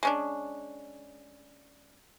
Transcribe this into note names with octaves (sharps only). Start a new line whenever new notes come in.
G#3 C#4 D4